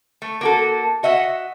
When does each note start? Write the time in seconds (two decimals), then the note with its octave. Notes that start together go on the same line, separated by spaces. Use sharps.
0.22 A3
0.41 A#3 F#4 A4
1.03 F#4 D#5 E5 F#5